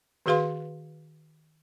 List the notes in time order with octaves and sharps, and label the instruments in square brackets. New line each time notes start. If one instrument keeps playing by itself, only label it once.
[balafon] D#3 F#4 G#4 B4 F5 C6